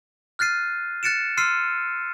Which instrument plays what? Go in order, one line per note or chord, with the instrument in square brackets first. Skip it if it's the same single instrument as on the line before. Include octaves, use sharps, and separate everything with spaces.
[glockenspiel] F6 F#6 A6 C7 D#7
F#6 A6 C#7 D7 E7
C6 E6 F6 C7 D#7